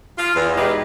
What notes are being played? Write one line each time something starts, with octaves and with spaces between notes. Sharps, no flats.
F4
E2
B2 G#3 D#4 G4 B4